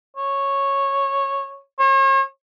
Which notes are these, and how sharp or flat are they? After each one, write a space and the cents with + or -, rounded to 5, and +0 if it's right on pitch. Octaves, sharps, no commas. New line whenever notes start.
C#5 -10
C#5 -45